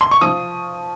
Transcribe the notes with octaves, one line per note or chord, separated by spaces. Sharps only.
C6
C#6
F3 D#6